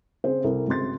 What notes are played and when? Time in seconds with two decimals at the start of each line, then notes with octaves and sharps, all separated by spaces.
0.24 C#3 C4 G#4 C5
0.44 C2 E4 A4 A#4
0.67 G#1 C#3 C4 C6 A6